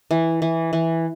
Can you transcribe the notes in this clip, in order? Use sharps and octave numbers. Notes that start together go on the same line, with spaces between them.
E3
E3
E3